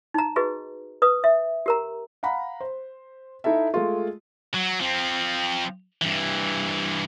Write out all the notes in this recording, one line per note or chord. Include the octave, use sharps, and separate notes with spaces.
D#4 A#5
F#4 G#4 B4 D#5
B4 D#6
E5
G4 A#4 A#5
F5 F#5 A#5 B5
C5
D#4 E4 A4 E5
G#3 A3 F4
F#3
F3 C4
G2 E3